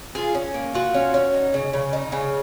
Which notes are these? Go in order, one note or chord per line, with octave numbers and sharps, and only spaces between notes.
F4 G#4
C#4
A#3
F4 F#4
C#4
C#4
D#4
C#3
C#3
D#4
C#3